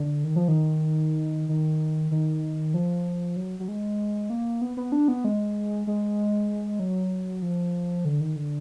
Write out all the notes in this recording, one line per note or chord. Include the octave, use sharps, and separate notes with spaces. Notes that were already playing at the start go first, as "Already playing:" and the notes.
Already playing: D3
D#3
F3
D#3
D#3
D#3
F3
F#3
F#3
G#3
A#3
B3
B3
D4
B3
G#3
G#3
F#3
F3
D3
D#3
D3